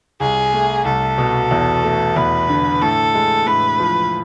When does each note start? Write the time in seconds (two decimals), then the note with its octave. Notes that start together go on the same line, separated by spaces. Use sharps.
0.20 C2 G#4
0.53 A3
0.85 C2 A4
1.18 B2
1.51 E2
1.84 A3
2.16 E2 B4
2.49 D3
2.82 A2 A4
3.15 G#3
3.46 A2 B4
3.80 F3